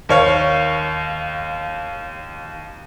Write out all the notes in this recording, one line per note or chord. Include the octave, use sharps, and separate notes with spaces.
D#2 C#5 F5